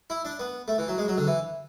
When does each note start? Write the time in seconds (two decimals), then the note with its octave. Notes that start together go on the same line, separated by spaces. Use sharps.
0.10 E4
0.25 D4
0.39 B3
0.68 A3
0.78 E3
0.88 F#3
0.98 G#3
1.08 F#3
1.18 D3
1.27 E3